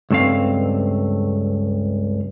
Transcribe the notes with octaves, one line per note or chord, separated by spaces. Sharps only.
C#2 G2 A3 C4 F5